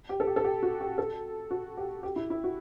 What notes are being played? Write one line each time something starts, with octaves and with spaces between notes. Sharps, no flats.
G4
A4
G4
A4
G4
F#4
G4
A4
F#4
G4
G4
E4
E4
F#4